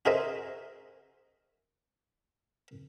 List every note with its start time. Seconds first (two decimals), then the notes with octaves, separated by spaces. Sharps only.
0.05 F#4 G#4 A#4 C5 D#5 E5